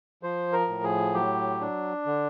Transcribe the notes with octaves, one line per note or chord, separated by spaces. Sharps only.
F3 C5
A#4
A2
G#4
F#3 G4
D4
D3